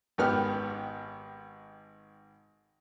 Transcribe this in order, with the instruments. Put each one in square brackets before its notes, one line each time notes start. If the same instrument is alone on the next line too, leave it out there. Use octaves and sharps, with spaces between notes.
[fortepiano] G#1 D#3 B3 G4 F6